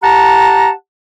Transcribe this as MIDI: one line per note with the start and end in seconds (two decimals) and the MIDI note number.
0.03 0.70 67
0.03 0.70 78
0.03 0.70 81
0.03 0.70 82